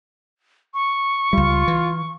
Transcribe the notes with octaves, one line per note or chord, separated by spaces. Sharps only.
C#6
C#2 G3 F4
E3